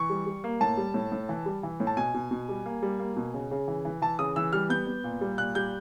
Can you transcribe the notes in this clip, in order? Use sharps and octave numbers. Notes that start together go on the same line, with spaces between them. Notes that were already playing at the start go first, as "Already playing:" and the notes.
Already playing: E3 C#6
G3
G3
A#3
A2 A5
G3
A2
A2
E3
G3
E3
A2
A5
B2 G#5
B2
B2
G3
A#3
G3
A#3
B2
C#3
C#3
E3
E3
E3 A5
C#3 D#6
E3 E6
G3 F6
B3 G6
B3
A#2
G3
A#2 F#6
G3 G6